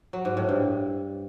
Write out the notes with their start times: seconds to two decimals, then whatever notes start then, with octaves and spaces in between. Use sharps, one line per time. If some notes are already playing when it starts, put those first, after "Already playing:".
0.13 F#3
0.25 G#2
0.37 A2
0.49 G2